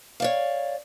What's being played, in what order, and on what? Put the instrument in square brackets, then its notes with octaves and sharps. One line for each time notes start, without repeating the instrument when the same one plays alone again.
[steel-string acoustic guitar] C#5 D5 F5